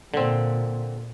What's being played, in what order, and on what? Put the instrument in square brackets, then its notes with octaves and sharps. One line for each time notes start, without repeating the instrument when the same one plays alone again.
[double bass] A#2 [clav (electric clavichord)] D3 C4